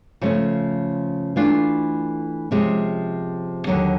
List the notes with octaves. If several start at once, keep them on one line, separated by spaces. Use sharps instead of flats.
C#3 F3 A3 C#4
E3 A3 D4 F4
C3 F3 G#3 C#4
D#2 D3 F#3